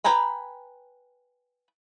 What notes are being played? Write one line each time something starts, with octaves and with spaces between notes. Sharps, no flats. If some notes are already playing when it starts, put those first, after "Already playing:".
B4 G5 G#5 A#5 B5